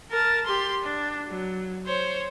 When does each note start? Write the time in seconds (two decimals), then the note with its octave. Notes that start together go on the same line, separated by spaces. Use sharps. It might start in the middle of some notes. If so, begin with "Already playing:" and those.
0.11 A#4 A5
0.46 G4 C6
0.83 D4
1.28 F#3
1.86 C5 C#5